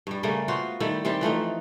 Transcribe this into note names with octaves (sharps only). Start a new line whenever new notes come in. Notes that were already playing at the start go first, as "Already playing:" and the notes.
G2 G3
C#3 G3 A3 A#3
B3 F4 F#4 C5
D#3 G3 A3 E4
D#3 G3 C4 G4
E3 F3 A3 D#4